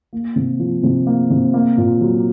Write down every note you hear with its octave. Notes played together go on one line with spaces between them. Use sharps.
A#3
C3
F3
C3
A#3
C3
A#3
A#2
F#3